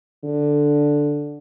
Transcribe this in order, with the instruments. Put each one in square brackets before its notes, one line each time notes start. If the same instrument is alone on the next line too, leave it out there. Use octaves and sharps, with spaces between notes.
[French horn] D3